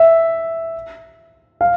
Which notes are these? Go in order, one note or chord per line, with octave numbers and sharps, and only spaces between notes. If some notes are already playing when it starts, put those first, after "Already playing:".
Already playing: E5
F5